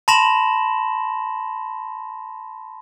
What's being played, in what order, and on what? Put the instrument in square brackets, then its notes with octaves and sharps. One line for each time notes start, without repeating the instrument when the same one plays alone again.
[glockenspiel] A5 B5 C6 A#6 E7 F#7